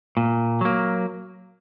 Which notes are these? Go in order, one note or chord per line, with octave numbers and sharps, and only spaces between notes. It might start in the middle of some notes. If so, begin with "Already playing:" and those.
A#2
F#3 A#3